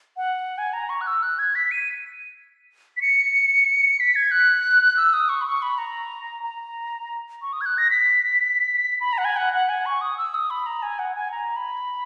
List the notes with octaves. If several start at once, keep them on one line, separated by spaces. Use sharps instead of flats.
F#5
G#5
A#5
C#6
F#6
E6
F#6
G#6
B6
D#7
B6
C#7
B6
G#6
F#6
E6
D#6
C#6
B5
C#6
B5
A#5
A#5
C#6
D#6
G#6
F#6
A#6
B6
B5
A#5
F#5
G#5
F#5
F#5
G#5
C#6
D#6
E6
D#6
B5
A#5
G#5
F#5
G#5
A#5
B5